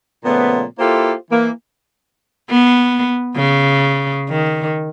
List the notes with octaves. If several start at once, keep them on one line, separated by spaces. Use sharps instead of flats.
A#2 C#3 F3 A3 B3
A#3 E4 F4 G4 A4 C5
E3 A#3
B3
C#3
D#3